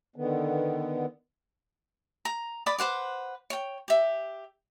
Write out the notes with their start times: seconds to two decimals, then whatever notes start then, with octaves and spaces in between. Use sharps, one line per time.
0.16 D3 D#3 B3
2.25 A#5
2.66 D5 B5 D6 D#6
2.78 B4 C5 F#5 D6
3.50 C#5 G5
3.88 G4 E5